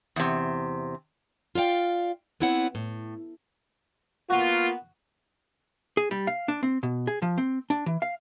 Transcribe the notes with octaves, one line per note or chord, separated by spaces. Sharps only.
E2 C3
F4 D5 F5 G5
B3 C4 E4 C#5 F#5
A2
A#3 B3 F4 F#4
G#4
G3
F5
D4
C4
B2
G#4
F3
C4
D4
E3
F5